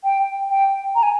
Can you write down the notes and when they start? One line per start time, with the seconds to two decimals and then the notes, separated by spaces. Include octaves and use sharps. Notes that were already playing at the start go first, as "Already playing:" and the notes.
0.04 G5
0.50 G5
0.95 A#5
1.03 G#5